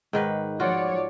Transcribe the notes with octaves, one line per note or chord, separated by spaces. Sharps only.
G#2 D#3 B4
F3 F4 F#4 C#5 D5